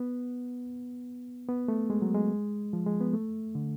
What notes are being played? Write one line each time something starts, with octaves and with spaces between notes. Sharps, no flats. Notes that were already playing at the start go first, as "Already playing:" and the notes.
Already playing: B3
B3
A3
G#3
F#3
G#3
F3
G#3
B3
A3
D3